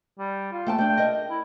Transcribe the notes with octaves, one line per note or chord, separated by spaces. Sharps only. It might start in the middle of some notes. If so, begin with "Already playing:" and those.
G3
F4
A3 G5 A5
A3 D4 G5
A#4 D#5
E4